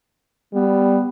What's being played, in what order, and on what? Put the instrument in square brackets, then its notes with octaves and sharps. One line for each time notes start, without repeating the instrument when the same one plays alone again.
[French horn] G3 [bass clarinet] B3